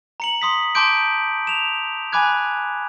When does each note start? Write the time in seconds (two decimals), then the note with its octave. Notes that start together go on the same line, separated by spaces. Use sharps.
0.20 A#5 C#7 F#7
0.42 C6 D#6 B6
0.75 A5 C6 D6 G6 D7
1.47 E7 F7
2.12 G#5 B5 D6 F#6 G#6